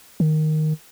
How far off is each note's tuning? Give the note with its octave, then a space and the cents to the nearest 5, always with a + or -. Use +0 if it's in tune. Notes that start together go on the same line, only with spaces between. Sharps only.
D#3 -5